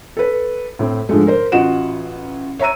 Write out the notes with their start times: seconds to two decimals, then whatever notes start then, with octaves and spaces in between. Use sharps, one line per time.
0.17 A4 B4
0.79 A2 C4
1.09 G#2 D3 F3 G#3 A3
1.27 A#4 C5
1.52 A1 F4 F#4 D#5 F#5 E7
2.59 C#5 E5 A#5 E6 D#7